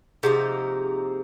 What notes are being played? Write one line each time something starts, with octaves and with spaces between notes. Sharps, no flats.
C3 F3 A#3 D#4 G#4